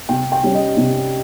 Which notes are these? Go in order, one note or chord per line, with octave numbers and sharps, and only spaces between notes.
C3 G5
G5
G3 C#4
D#5
C3